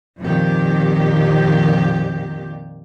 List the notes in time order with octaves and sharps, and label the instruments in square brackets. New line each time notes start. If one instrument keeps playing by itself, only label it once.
[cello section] F2 A#2 D#3 G4